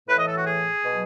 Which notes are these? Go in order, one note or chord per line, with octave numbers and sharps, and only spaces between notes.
A2 E3 B4
D#5
A4
F#4
G#4
B2 F#3